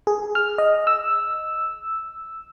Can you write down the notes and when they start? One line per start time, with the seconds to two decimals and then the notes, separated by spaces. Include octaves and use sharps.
0.07 G#4
0.35 F6
0.58 D#5
0.87 E6